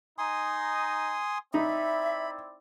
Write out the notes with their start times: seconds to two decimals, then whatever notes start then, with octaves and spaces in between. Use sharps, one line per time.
0.18 D#4 G#5 C6 D#6
1.54 C4 D#4 E4 D5 E5 B5